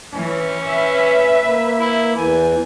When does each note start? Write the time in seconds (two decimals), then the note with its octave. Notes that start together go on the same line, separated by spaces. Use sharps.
0.13 E3 C#4
0.66 B4 E5
1.44 A#3
1.79 E4
2.17 E2 E3 G#5